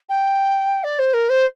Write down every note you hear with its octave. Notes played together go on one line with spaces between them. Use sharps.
G5
D5
C5
A#4
C5